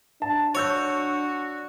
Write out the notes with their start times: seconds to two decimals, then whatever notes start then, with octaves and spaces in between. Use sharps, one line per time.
0.22 D4 A5
0.55 F#4 C#5 C#6 E6 G6